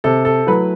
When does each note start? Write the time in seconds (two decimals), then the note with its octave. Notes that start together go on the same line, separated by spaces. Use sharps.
0.04 C3 A4
0.25 A4
0.47 F#3 A3 E4 B4